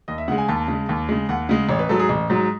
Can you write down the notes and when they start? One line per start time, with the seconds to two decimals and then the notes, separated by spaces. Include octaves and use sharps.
0.08 D#2 D#5
0.18 E5
0.28 C#3 G#3 F#5
0.38 G#5
0.48 D#2 A5
0.68 C#3 G#3
0.89 D#2
1.09 C#3 G#3
1.29 D#2 F#5
1.49 C#3 G#3
1.69 A1 C#5
1.79 B4
1.89 G#2 F#3 A4
1.99 G#4
2.09 A1
2.30 G#2 F#3